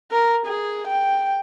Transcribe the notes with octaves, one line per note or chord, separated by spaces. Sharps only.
A#4
G#4
G5